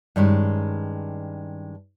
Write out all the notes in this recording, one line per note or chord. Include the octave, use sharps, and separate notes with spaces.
G2 D#3 G#3 C#4